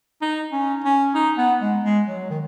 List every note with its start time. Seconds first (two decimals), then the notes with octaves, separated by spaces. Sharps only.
0.22 D#4
0.53 C#4
0.84 C#4
1.15 D#4
1.38 B3
1.61 G#3
1.84 G#3
2.08 F#3
2.30 D#3